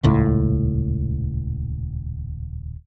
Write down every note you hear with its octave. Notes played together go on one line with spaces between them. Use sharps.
D#1 C#2 A2